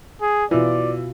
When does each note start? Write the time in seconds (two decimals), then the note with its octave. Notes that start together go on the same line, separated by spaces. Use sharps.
0.22 G#4
0.51 B2 E3 F4 D5